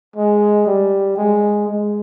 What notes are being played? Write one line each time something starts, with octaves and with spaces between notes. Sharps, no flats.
G#3
G3
G#3
G#3